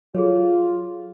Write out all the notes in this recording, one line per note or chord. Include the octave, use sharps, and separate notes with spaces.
F#3 F4 G#4 A4 C#5